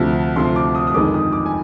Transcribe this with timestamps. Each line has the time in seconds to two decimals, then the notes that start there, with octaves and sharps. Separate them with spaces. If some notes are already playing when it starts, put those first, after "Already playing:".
Already playing: D2 C3 F3
0.36 D2 C3 F3 C6
0.56 D6
0.75 D#6
0.87 D#6
0.94 G1 F2 D#3 G#3 D6
1.14 D#6
1.33 D6
1.46 G#5